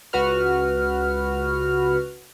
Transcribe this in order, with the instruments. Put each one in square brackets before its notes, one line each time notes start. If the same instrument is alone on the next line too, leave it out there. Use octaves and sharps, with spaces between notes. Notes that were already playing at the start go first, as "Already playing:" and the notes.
[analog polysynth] C#2 F#4 B4 F6